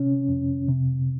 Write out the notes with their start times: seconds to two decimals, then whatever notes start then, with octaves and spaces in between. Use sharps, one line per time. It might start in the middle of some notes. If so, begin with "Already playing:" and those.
Already playing: C3 C#4
0.29 F2
0.68 C3